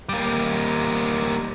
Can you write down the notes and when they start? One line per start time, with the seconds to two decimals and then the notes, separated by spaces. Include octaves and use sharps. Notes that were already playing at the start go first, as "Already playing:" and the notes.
0.09 G3 A#3